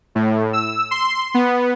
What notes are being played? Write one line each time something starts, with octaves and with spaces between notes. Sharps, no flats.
A2
E6
C6
B3